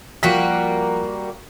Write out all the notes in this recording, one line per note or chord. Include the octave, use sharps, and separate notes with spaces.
F3 G3 A#3 F#4 B6